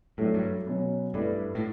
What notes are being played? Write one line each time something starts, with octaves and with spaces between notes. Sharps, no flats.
A2 F#3 A3 D4
G2
B2 F#3 C#4
G2 A3 E4 B4 D5
A2